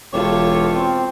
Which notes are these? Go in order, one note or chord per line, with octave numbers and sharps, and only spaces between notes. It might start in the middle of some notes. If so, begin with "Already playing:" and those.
E1 F4 G4 A4 C#5 C#6
C4